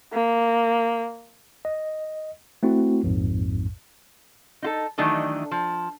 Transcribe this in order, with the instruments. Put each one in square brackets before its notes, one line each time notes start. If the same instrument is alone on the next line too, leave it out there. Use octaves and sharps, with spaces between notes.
[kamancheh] A#3
[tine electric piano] D#5
A3 C4 E4 F#4
A#1 F2 G#2
[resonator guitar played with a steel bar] D#4 F4 A4
D#3 E3 F#3 A3 D4 D#4
F3